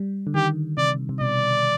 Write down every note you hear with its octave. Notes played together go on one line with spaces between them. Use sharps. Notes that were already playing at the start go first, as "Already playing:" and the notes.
Already playing: G3
D3
D#3 G4
C3 D5
C3
B2 D5